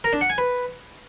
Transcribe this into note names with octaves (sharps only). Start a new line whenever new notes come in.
A#4
D4
F#5
G#5
B4